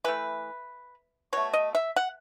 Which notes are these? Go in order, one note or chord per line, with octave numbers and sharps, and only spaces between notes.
E3 A3 B4
B2 A3 C#5
D#5
E5
F#5